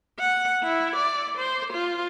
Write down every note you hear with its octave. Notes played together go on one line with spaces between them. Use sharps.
F#5
E4
D5
C5
F4